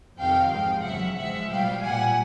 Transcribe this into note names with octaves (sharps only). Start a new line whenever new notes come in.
F2 C3 D#3 F5 G5
G#2 F3 G#3 F5 G5
E2 C#3 F#3 E5 F#5
G#2 F3 G#3 E5 F#5
B2 G3 F5 G5
A#2 G3 F#5 G#5